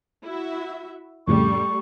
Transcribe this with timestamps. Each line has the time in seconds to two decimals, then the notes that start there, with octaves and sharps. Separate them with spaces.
0.22 E4 F#4 E5
1.28 F2 A2 C#3 G3 A3 C#6